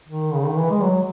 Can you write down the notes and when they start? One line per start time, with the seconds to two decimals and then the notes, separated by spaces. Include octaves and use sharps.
0.08 D#3
0.34 C#3
0.45 D#3
0.57 E3
0.70 G#3
0.82 F#3